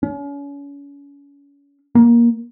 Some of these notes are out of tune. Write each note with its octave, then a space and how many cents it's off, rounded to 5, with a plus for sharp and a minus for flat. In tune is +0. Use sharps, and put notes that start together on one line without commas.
C#4 +35
A#3 +15